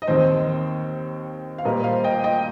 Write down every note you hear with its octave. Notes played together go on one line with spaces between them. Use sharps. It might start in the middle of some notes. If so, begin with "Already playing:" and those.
D#5
D#2 D#3 C4 C5
F5
A#2 G3 A#3 A#4 D#5
C5 F5
D#5 G5
D#5 G5